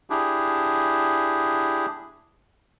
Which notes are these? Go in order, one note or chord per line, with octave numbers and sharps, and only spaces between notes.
D4 E4 G4 G#4